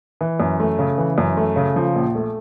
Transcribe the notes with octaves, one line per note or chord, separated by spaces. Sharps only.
E3
F#2
A3
C#3
E3
F#2
A3
C#3
F3
A#1
A3